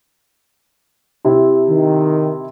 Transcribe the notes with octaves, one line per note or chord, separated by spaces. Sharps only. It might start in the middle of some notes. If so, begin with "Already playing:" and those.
C3 E4
D#3